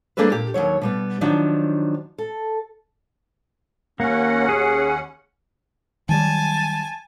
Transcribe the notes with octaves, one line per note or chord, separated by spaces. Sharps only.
G3 A#3 D4 G#4 A4 B4
A#2 G4
D#2 C#3 F#3 C#5
B2 G3 B3
D#3 F3 F#3 D4
A4
D#2 A#3 C#4 F#5
G#4
D#3 F#3 G3 G#5 A5